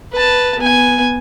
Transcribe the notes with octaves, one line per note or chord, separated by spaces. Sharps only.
B4 A5
B3 G#5